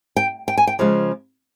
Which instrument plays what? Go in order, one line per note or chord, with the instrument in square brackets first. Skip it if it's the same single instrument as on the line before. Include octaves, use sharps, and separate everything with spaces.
[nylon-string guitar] G5
G5
G#5
G5
C#3 F3 G#3